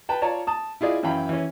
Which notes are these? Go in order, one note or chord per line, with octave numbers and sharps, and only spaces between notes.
B4 G5 A5
F4 C#5 D5 A5 A#5
A5 D#6
E4 F4 G#4 D5 D#5
F#2 E3 F5 G5 B5
E3 C#4